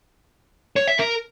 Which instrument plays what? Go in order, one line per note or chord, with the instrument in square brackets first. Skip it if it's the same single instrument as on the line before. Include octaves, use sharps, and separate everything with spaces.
[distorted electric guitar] C#5
E5
A#4